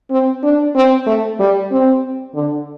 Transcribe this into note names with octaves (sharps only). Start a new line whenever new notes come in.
C4
D4
C4
A3
G3
C4
D3